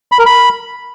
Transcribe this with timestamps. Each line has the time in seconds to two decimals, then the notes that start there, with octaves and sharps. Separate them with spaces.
0.12 B5
0.19 A#4
0.26 B5